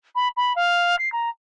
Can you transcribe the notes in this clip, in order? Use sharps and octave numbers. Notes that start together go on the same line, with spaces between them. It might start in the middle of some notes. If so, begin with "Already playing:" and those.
B5
B5
F5
C7
A#5